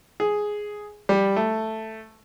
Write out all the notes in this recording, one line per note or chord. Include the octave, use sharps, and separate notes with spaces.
G#4
G3
A3